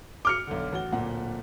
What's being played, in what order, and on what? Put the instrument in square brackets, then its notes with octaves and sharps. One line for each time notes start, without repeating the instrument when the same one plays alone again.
[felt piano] D6 F6 C#7 [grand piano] G7
[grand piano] B1 D3
A1 F#4 G7
D1 A#2 F#5